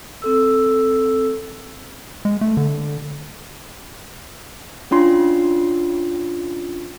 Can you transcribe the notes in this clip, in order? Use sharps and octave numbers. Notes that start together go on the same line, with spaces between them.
C4 A4 E6
G#3
A3
D3
C#4 D4 F4 C6